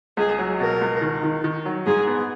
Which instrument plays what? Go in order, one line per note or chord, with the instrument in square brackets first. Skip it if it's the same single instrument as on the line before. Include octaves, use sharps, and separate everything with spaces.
[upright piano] C#2 [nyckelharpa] G#4
[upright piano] F#3
[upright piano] B2 [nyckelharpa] A#4
[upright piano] C#2
D#3
D#3
D#3
F#3
[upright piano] G#2 [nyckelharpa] G#4
[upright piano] B3